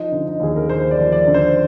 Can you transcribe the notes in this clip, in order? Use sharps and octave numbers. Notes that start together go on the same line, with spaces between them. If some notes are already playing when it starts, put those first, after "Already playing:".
Already playing: F3 D#4
D3
D#4
D#2 G#4
A#4
D#2 C5
D5
F3
D5
D3
C5